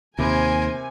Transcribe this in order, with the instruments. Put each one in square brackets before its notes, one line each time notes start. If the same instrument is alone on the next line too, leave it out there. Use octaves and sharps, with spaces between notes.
[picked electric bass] D#2 [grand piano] C3 B5 [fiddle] A#4 C5 [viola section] G#5